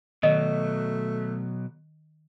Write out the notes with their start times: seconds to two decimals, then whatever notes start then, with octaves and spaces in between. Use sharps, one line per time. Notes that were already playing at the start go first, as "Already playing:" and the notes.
0.23 B2 D#3 F#3 A3 D#5